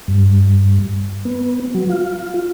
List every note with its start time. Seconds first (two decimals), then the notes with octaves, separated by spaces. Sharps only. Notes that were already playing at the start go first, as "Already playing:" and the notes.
0.08 G2
1.25 B3
1.74 F#3
1.89 F4